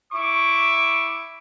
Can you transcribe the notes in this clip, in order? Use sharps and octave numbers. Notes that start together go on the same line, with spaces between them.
E4 C#6 D6